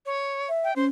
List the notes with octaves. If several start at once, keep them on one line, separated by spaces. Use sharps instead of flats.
C#5
E5
G5
C#4 C5